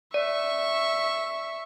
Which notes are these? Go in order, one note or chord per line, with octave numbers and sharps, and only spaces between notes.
D5 E5 C#6